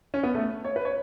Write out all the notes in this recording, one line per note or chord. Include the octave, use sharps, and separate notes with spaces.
C#4
B3
A3
C#5
B4
C#5